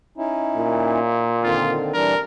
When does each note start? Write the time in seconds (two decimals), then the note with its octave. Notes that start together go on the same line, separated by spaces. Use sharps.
0.17 C#4 D#4 E4
0.56 A#2
1.43 D3 D#3 C4 F4
1.94 E3 G3 D4 A#4